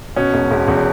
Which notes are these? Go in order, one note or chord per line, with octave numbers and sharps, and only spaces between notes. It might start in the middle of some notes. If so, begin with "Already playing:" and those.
B2 C#4
E1
E1
E2